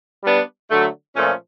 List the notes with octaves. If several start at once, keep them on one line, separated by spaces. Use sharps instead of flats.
G3 B3 D4
D3 F#3 A3
A#2 F3 A3 C#4